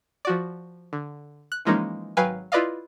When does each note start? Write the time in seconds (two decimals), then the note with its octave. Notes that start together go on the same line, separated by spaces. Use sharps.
0.25 F3 F#4 D5
0.93 D3
1.52 F#6
1.65 E3 F3 G#3 A#3 C#4 D#4
2.17 G#1 F#3 B4 F5 G5 G#5
2.52 E4 F4 B4 D5 D#5 F5